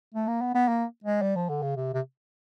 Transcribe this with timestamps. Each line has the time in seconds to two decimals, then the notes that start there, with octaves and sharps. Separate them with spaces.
0.14 A3
0.28 A#3
0.41 B3
0.55 B3
0.68 A#3
1.04 G#3
1.22 G3
1.36 F3
1.49 D3
1.62 C#3
1.76 C3
1.94 C3